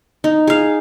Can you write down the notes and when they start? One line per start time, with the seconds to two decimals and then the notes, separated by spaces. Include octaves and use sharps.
0.24 D#4
0.47 G#4 F5